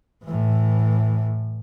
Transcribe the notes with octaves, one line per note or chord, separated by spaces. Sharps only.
A2 E3